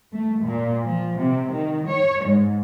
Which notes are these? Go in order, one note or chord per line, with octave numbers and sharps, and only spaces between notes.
A3
A#2
F3
C3
D#3
C#5
G#2